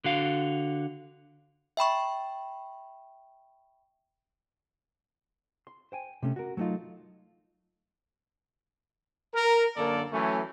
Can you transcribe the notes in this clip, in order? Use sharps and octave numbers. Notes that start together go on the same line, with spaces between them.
D3 F#4 F5
E5 G5 B5 C#6
C6
C5 G5 G#5
C3 A3 C#4
F#4 A#4
F#3 A3 C4 D#4 F4
A#4
F#2 D3 A#3 A4 D5
E3 F#3 A3 C#4